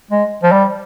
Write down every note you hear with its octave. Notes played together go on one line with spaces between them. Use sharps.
G#3
F3
G3